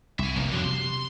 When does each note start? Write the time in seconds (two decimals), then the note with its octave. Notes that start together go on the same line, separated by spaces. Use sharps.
0.19 C2 E5 G#5
0.36 F1 C2 A2 A#3
0.52 F2 B2 D3 F#3
0.64 C3 C6